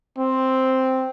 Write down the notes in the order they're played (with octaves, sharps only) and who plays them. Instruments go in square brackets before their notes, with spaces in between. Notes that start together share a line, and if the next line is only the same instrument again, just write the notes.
[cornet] C4